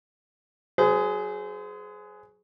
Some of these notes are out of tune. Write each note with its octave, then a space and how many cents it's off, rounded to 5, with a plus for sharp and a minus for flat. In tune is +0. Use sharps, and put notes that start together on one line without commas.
F#3 +0 G#4 +15 C5 -35